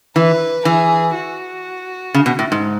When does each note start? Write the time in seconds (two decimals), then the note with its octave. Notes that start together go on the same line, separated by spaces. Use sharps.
0.16 E3 B4
0.65 E3 G#4
1.15 F#4
2.14 C#3
2.26 B2
2.39 A2
2.52 G#2